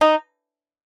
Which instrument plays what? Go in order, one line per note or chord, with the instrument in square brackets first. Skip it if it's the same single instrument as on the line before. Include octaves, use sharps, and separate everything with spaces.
[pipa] D#4